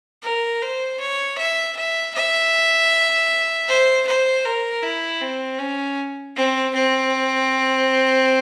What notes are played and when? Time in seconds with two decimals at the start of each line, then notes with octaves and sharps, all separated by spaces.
0.23 A#4
0.62 C5
1.00 C#5
1.38 E5
1.76 E5
2.15 E5
3.68 C5
4.07 C5
4.45 A#4
4.83 E4
5.21 C4
5.59 C#4
6.37 C4
6.74 C4